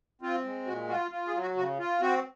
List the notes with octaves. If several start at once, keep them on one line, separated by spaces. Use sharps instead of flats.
C4 F4
G#3
A#2 F#4
F4 F#4
F4
G#4
F#3
F#4
C#3 F#4
F4
C4 F#4